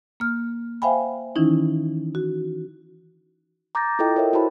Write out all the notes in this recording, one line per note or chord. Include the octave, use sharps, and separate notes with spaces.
A#3 F6
C5 E5 F5 G5 G#5 B5
D#3 E3 C#4 D#4 E4
F#4
A#5 D6 G6 A6 A#6
E4 F4 A4 D#5 G5
A#4 C#5 E5
E4 F#4 C5 A5 B5